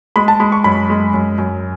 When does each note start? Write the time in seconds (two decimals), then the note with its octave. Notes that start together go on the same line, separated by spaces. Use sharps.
0.16 G#3 B5
0.28 A5
0.40 G#3 B5
0.52 C#6
0.64 F#2 B5
0.90 G#3
1.14 F#2
1.38 F#2